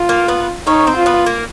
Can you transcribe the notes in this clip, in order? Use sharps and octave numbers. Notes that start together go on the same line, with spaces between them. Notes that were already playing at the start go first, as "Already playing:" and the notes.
Already playing: F4
A#3 A#4
B3 B4
C#4 D#4 C#5
C4 C5
F4
B3 B4
A#3 A#4